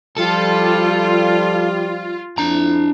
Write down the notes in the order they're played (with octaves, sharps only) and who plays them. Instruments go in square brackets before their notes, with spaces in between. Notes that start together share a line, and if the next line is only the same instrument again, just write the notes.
[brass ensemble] F3 G3 [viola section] F4 [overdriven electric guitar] A4
[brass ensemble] F2 E4 [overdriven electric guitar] D4 A#5